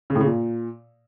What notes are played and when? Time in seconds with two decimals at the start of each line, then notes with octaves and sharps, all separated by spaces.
0.10 C#3
0.15 A2
0.20 C#3
0.26 A#2